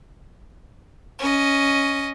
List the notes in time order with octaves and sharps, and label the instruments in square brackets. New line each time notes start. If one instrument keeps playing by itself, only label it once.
[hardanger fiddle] C#4 D#5